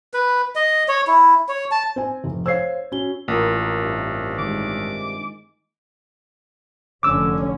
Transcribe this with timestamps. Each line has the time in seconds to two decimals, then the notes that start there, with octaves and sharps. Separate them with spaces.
0.14 B4
0.56 D#5
0.88 C#5
1.07 E4
1.48 C#5
1.71 A5
1.96 C4 G#5
2.24 F1
2.46 C5 C#5 F5 E6 G#6 C7
2.92 C#4 F#4 G7
3.28 A1 A#3 F4 A#4
3.80 G2 C3
4.38 D#3 G#3 D6
7.03 F1 D3 C#4 D6 E6